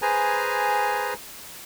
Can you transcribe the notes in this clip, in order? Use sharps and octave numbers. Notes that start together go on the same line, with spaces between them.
G#4 B4 C5 G#5 A#5